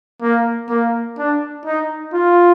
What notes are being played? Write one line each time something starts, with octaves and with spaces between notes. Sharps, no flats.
A#3
A#3
D4
D#4
F4